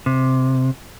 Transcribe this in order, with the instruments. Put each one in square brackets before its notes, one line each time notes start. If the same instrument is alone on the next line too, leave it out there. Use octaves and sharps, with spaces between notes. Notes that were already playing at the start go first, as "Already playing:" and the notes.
[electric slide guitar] C3